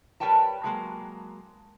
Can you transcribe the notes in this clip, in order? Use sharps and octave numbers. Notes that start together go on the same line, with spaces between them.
G3 A#4 B4 C#5 G5 A5
F#3 G#3 A#3